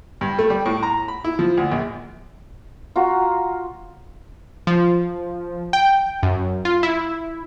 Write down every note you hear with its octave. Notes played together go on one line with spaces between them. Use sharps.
G2
A3
G3
A2
A#5
B5
E4
F3
D2
A#1
F4 F#4 A#5
F3
G5
F#2
F4
E4